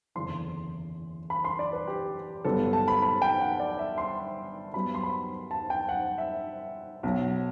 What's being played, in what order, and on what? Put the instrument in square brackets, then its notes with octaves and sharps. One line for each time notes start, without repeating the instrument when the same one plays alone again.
[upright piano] F#1 E2 D3 C6
B5
C6
D5
B4
G4
G1 G2 F#3 B3 A4
A5
B5
B5
G5
F#5
D5
E5
C6
G2 F#3 B3 B5
C6
B5
A5
G5
F#5
E5
B1 B2 F#3